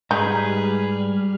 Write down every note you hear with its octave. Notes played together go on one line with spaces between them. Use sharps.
G#2 G3 D#4 G#4 B4 F6